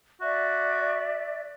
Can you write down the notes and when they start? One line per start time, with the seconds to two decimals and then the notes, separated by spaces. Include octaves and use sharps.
0.21 F#4 D5 E5